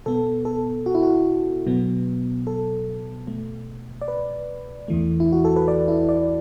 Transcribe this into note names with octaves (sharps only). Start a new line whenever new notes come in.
B2 B3 A4
A4
F#4
E4
F#4
B2 F#3 B3
A4
B2 A3
D5
B4
E2 E3 A3
E4
F#4
A4
B4
D5
E4
D5